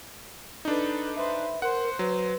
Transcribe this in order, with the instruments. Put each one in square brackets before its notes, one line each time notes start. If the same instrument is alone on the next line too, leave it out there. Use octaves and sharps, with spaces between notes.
[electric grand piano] D4 D#4 [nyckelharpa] A4 B4
[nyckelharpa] B4 C5 [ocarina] E5
[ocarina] A#4 [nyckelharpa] C5 [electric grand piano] F#5
[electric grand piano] F#3 [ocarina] B4